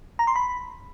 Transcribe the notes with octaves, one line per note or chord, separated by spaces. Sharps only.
A#5
C6
B5